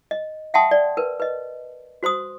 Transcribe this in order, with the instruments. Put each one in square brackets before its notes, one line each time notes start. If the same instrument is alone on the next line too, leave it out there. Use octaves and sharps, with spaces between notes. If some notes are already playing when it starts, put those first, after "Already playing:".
[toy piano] D#5
E5 F#5 G5 A5 C6 D#6
D5
A#4 B4
B4 D#5
F#4 C5 C6 D#6